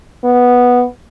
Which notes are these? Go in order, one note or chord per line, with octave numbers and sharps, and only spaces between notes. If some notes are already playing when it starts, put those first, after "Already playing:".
B3